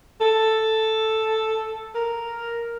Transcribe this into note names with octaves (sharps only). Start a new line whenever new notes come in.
A4
A#4